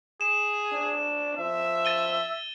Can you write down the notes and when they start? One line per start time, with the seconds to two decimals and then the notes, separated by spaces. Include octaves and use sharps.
0.21 G#4 E7
0.72 D4
1.38 F3 E5
1.85 A6 D#7 G7